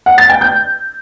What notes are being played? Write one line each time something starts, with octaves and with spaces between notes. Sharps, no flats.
F#5
A6
G5
G6